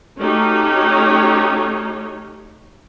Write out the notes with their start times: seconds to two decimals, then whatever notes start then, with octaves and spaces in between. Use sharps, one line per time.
0.18 A3 C#4 D#4 F#4 G4 C#5